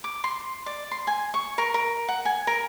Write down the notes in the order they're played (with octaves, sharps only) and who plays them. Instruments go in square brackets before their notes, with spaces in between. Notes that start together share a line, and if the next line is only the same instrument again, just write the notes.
[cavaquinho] D6
C6
D5
C6
G#5
C#6
A#4
A#4
F#5
G#5
A#4